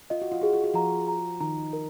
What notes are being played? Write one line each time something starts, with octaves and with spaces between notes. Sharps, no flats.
F4 D#5
F#4
F4
F#4 G#4
F4
F#4
F3 F4 A#5
A#5
D#3 D#4 A#5
A#4